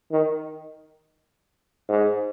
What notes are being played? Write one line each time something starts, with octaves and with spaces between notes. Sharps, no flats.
D#3
G#2